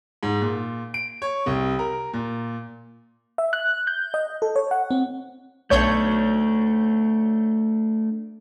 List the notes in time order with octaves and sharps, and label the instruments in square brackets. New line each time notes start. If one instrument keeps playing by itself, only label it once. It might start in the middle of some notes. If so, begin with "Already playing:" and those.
[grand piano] G#2
A#2
D7
C#5
C2
A#4
A#2
[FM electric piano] E5
F#6
G6
D#5
A4
C#5
F#5
C4
[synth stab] B1 C#5 G6 [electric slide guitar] A3 D4